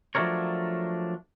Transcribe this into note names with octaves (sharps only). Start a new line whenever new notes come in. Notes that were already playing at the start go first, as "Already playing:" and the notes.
F3 F#3 A3 D4 A#4 C#5